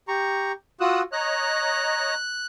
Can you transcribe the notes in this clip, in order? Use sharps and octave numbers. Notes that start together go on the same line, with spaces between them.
G4 A#5 C#6
F4 F#4 D#6 E6 F#6
C#5 D#5 A#5 F#6